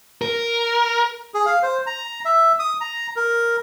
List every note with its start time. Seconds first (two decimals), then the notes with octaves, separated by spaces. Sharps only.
0.22 A#4
1.34 G#4
1.46 F5
1.63 C5
1.86 A#5
2.25 E5
2.59 D#6
2.81 A#5
3.16 A#4